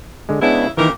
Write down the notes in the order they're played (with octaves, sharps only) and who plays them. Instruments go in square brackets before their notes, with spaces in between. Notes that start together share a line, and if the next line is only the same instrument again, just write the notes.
[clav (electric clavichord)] D3 G#3
[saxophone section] C#3 E4 [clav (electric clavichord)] G#3 B3 D4
[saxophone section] A#2 G4 A#4 [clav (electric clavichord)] D#3 E3